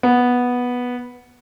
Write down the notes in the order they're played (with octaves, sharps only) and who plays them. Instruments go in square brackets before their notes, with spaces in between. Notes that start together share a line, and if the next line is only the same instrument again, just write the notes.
[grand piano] B3